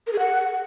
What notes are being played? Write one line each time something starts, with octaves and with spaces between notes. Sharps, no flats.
A#4
G#4
F#5